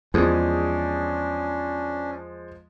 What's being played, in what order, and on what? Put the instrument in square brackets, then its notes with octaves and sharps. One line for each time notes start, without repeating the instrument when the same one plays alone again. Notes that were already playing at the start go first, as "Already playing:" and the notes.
[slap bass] E2 [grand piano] F3 G#3 D#6 [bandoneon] C#4 D4